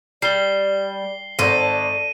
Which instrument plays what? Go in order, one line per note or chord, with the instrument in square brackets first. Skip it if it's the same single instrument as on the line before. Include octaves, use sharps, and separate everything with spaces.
[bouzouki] G3 [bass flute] D5 [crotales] C7 G7
[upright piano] G#1 C5 A#6 [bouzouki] A4 [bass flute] D5 [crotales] D#7